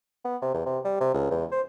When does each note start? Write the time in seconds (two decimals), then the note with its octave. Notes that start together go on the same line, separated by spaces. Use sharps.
0.25 B3
0.42 C3
0.54 E2
0.66 C3
0.85 G3
1.00 C3
1.14 C#2
1.31 E2
1.52 C5